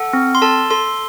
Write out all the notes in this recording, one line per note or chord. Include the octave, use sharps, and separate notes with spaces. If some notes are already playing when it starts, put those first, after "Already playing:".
Already playing: A4 F#5
C4
C6
A4 A5
A4 C6